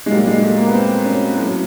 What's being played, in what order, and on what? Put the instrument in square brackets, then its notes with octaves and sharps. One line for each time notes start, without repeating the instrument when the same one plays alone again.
[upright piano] G#3
A#2 F#3 G3
G#3
A3
A#3
B3
C4
C#4
A2 F#3